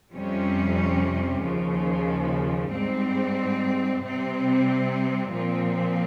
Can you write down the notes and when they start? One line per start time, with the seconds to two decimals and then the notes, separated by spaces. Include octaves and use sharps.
0.13 F2 C3 G3 C#4
1.42 D#2 C#3 F3
2.72 G#2 G3 C4
4.01 C3 G3 C4
5.31 A#2 F3 C4